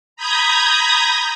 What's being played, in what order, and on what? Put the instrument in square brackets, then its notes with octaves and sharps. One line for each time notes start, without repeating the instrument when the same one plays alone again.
[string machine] A#5 B5 D#6 G6 G#6 A#6